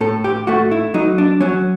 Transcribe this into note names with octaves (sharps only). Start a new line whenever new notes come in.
A2 A4
G4
A3 F#4
E4
F#3 D#4
D4
F#3 C#4